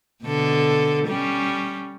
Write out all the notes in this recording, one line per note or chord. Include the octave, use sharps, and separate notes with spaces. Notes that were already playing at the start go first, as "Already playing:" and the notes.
B2 D3 A4
G3 C#4